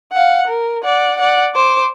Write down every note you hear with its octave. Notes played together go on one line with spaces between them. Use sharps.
F5 F#5
A#4
D5 F#5
D5 F#5
C5 D6